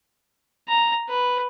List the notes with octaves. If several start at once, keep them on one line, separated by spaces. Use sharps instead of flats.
A#5
B4